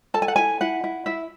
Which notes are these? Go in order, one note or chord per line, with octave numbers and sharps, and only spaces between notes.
A4 A5
G#5
F#5
E4 G#5
E4 F#5
E4
E4 E5